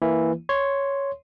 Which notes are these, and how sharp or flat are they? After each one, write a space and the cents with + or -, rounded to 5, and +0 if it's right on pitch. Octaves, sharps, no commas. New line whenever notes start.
E3 +0 A#3 +0 E4 +0
C#5 +0 C6 +0